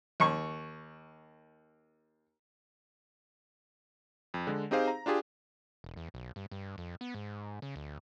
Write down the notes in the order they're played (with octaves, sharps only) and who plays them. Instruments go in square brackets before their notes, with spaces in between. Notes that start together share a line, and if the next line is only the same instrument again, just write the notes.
[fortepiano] D#2 C#6
[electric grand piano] F2
D3 G#3
C4 D#4 G4 G#4 C5 F5
A#5
D4 F4 G4 G#4
[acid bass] E1
E2
B1
G2
G2
F2
B3
G#2
C#3
D2